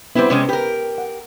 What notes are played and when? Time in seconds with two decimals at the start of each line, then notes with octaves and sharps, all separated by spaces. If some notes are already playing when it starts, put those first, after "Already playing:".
0.15 G3 B3 C4 E4 C5
0.30 C3 G#3 C#4
0.49 G4 A#4 B4
0.98 F#5